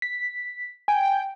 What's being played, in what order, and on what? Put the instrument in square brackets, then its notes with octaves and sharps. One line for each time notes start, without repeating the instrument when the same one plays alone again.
[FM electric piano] B6
[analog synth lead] G5 [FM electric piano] G#5